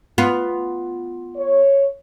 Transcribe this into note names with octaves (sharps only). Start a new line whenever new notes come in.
B3 F4
C#5